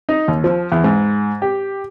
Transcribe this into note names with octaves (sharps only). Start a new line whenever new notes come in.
D#4
D#2
F3
E2
G#2
G4